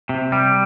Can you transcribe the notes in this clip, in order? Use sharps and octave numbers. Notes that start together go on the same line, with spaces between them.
C3
G3